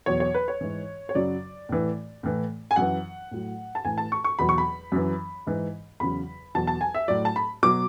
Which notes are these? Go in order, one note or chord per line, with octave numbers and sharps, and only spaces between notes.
E2 B2 F#3 C#5
C#5
B4
C#5
G#2 E3
C#5
F#2 C#3 F#3 D5
A2 E3
A2 E3
G#5
F#2 E3 F#5
A2 F#3
A5
A2 E3 G#5
A5
C#6
C#6
E2 B2 F#3 B5
C#6
B5
F#2 E3
G#2 E3
E2 C#3 F#3 B5
E2 B2 F#3 A5
A5
G#5
E5
A2 F#3 D5
A5
B5
B2 F#3 D6